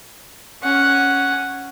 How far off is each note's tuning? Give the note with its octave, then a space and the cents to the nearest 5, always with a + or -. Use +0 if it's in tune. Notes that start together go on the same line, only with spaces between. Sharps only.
C#4 +0 F#5 +0